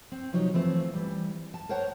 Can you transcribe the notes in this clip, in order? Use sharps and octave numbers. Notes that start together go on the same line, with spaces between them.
C4
C3 F3 F#3 D#4 C#5
E3 F3 A3 C4
E3 G3
A5
A#4 C5 C#5 F#5 A5 A#5